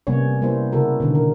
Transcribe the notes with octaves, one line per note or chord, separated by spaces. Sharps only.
C3 G3 A#3 B3 C#4 C#5
G3 A#3 B3 E4 C5
C#3 E4 F#4 A4 A#4
B2 D3 D#3
A#4